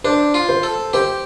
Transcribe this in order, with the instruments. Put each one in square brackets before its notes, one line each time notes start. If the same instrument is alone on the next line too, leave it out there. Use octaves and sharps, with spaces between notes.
[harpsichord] D4 [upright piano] C5
[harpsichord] F4
[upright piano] C5
[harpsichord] A4
[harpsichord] G4 [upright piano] C5